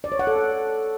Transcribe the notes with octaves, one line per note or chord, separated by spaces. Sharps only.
D5
C#5
F#5
A4